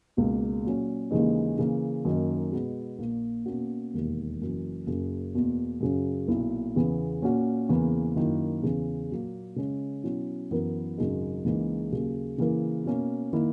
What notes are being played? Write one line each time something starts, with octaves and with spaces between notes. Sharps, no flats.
C#2 B2 A#3
A#2 F#3 C#4
D#2 C#3 E3 G#3 D#4
C#3 E3 A#3
F#2 D#3 A#3 D#4
B2 G#3 B3
A#1 A#2 A#3
B2 A#3 C#4 F#4
E1 D#2 D#3
F#1 F#2 E3
F#1 F#2 C#3
E2 B2 A#3
F#2 C#3 F#3 C#4
B1 A#2 A#3 E4
E2 C#3 E3 B3
A#2 A#3 C#4 F#4
E2 C#3 E3 A#3
F#2 D#3 A#3 E4
E2 C#3 E3
A#2 F#3 A#3
C#3 G#3 C#4
B2 F#3 C#4 E4
F#2 E3 B3 E4 A#4
G#1 F#2 C#3 G#3 D#4
C#2 C#3 E3 A#3 D#4
D#2 C#3 F#3
C#3 E3 A#3 E4 A#4
B2 A#3 C#4
D#3 A#3 E4